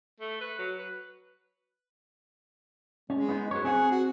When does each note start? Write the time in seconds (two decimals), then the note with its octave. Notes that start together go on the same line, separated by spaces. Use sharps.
0.20 A3
0.41 B4
0.59 F#3
0.78 B4
3.10 G#3 C#4
3.29 B3 D#4
3.51 F#2 B4 C#5
3.64 C4 D#4 G#4 F#5
3.91 F#4